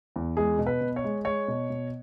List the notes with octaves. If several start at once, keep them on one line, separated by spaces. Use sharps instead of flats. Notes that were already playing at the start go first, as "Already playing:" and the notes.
E2
G#3 G#4
B2
B4
B2
C#5
G#3
G#3 C#5
B2
B2